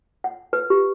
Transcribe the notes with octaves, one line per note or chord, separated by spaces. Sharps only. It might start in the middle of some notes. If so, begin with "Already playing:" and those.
F#5
B4
G4